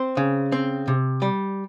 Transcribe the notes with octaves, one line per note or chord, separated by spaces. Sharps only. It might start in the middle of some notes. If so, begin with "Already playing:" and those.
Already playing: C4 C5
C#3
C4
C3
G3